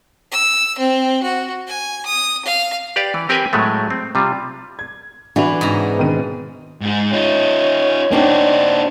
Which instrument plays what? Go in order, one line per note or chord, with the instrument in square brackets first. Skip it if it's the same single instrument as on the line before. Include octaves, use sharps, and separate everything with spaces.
[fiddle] E6
C4
F#4
G#5
D#6
F5
[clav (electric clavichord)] G4 B4 D5 F5
E3
C4 G4 A#4 B4 G5 G#5
A2 F#3 G#3 A3
C4
C3 G3 F4
[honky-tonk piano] G#6
[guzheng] E3 [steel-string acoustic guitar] D4 B4 [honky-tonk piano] F#4 E5 F7
[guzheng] G#2 C3 A#5
[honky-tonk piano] B2 D#3 D#7
[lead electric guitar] G#2 G#4
[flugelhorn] C#4 [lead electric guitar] D#4 F4
[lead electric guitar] A#3 F#4 [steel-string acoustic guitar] C4 D4 D#4